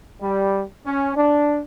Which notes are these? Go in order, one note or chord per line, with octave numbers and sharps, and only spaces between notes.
G3
C#4
D4